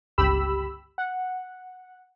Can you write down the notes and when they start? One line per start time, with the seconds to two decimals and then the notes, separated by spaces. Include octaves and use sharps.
0.18 G1 C#2 G4 B5 E6
0.98 F#5